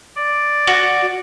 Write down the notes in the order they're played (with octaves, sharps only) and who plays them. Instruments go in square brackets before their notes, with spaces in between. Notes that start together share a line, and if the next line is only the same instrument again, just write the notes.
[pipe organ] D5
[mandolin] F#4